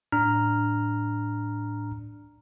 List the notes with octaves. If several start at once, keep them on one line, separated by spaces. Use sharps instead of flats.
A2 D4 A#5 F6